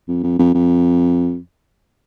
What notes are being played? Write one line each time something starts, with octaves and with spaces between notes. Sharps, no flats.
F2
F2
F2
F2